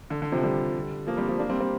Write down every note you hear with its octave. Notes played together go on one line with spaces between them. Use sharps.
D3
D3
C3 F3
D3 G3
F3 A#3
G3 C4
F3 A#3
A#3 D4
G3 C4
G3 C4